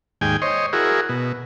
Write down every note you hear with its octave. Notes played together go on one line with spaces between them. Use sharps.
D#2 G#2 G5 G#5
C5 C#5 D#5
E4 F#4 G#4 A#4
B2